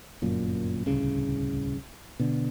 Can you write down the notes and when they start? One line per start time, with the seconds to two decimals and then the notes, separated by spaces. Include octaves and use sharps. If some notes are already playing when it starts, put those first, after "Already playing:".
0.22 G1 F#2 A#2
0.86 D1 C2 C#3
2.20 B2 D3